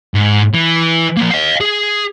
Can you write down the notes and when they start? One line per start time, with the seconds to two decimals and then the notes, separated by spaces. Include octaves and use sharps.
0.15 G#2
0.55 E3
1.17 F3 A#3
1.31 D#5 F5
1.61 G#4